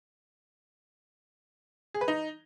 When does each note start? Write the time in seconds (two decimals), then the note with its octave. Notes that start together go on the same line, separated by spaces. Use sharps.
1.94 G#4
2.01 B4
2.08 D#4